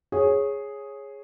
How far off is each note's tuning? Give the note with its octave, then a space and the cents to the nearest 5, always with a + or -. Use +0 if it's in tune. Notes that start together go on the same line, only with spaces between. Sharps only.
G#4 +0 C#5 -10